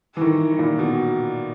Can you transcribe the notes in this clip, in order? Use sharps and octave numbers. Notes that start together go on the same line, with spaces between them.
E3
D#3
A#2
B2